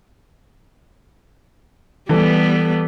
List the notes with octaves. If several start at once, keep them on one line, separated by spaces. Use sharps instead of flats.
E3 G3 B3 A4